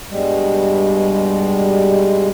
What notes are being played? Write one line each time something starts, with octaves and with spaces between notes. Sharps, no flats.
G2 B2 G3 G#3